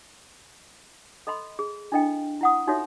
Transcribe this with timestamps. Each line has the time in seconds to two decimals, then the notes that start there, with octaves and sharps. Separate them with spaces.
1.27 A4 D#5 B5 C6
1.59 G#4
1.92 D4 E4 A4 D#5 F5 G5
2.41 E4 F#5 D#6
2.67 D#4 F4 F#4 A4 C#5 E5